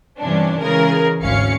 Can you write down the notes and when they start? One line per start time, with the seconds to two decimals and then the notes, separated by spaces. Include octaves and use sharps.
0.19 G2 C3 E3 C#4 D4
0.59 C#3 E3 G#3 G#4 A#4
1.22 G#1 D2 C#4 F5 C#7